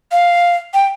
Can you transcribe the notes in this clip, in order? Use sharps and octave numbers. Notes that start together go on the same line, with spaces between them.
F5
G5